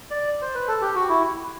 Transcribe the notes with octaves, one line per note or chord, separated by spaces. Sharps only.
D5
C5
B4
A4
G4
F#4
E4